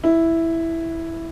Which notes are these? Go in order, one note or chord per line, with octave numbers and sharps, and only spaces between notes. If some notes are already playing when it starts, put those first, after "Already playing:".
E4